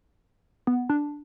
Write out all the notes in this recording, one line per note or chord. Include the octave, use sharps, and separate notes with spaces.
B3
D4